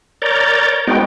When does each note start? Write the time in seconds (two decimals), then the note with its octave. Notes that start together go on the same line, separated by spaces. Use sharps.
0.22 A#4 C#5 D5 A#5 G6 A6
0.87 G#3 B3 C4 D#4 F#4 G5